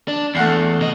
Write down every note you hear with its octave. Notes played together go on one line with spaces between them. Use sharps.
D4
E2 A3 F#5 C7
C3 D#5